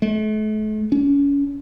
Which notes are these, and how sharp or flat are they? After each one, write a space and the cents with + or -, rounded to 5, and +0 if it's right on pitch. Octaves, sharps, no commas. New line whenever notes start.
A3 -40
C#4 +30